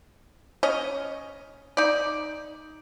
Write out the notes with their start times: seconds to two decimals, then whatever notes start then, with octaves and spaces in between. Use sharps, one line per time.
0.63 C#4 C#5 D#5
1.77 D#4 D5